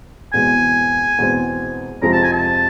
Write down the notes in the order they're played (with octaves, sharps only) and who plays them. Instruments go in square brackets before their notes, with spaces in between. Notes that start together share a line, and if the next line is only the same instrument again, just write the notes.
[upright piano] E2 B2 G#3 C4 [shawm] G#5
[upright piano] E2 B2 G#3 C4
[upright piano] F2 C3 F3 G#3 [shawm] A#5
[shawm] A5
G#5
A5